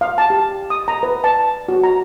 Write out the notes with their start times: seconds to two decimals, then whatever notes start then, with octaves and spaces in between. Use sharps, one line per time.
0.01 F5
0.18 A5
0.30 G4
0.70 D#6
0.88 A#5
1.03 B4
1.24 A5
1.68 F#4
1.83 A#5